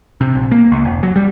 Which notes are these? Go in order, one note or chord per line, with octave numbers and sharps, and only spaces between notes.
C3
A#1
A#3
C#2
F1
F#3
G3